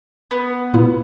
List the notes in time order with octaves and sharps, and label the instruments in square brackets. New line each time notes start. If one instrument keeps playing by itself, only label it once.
[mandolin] B3
[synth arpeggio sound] A#2 A#3 E4